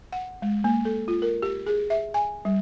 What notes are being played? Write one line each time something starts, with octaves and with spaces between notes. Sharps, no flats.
F#5
G#3
A#3
A4
F4
A#4
G4
G#4
E5
G#5
G3